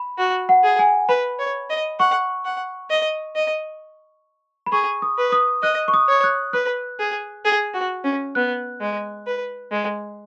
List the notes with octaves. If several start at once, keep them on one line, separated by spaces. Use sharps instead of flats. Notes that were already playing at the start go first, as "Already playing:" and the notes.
Already playing: B5
F#4
F#5
G#4
G#5
B4 B5
C#5
D#5
F#5 C#6
F#5
D#5
D#5
B5
G#4 C#6
D#6
B4
D#6
D#5 F#6
C#6
D#6
C#5
F#6
B4 F#6
G#4
G#4
F#4
C#4
B3 F#6
G#3
B4
G#3